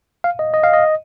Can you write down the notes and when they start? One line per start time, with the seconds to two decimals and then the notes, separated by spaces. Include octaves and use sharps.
0.24 F5
0.39 D#5
0.54 D#5
0.63 F5
0.73 D#5